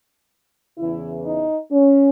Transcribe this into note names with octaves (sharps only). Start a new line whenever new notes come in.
E2 C#3 E3 E4
D#4
C#4